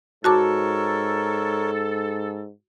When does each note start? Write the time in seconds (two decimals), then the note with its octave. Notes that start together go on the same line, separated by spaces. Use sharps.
0.24 G#2 F#4 A4 A#4 C#5 A5 D6